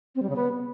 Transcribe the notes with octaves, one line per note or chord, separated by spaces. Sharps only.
C4
G3
C#3
B3